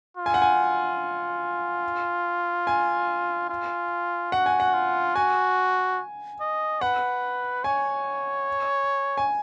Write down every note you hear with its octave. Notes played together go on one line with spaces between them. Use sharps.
F4
G#5
F#5
G#5
G#5
F4
F#4 F#5
G#5
F#5
F4
F#4 G#5
D#5
B4 F#5
C#5 G#5
G#5